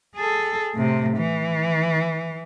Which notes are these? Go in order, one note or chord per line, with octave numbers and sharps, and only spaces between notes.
G#4 A4
A2 C3
E3